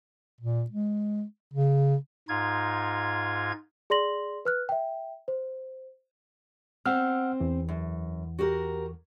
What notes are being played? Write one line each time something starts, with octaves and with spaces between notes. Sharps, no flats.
A#2
G#3
C#3
G#2 D#4 F4 G#6
G#4 D5 C6 A#6 F#7
B4 F6 F#6
E5 G5
C5
C4 F#5 E6 F6
E2 E3
F#2
F#4 G4 A#4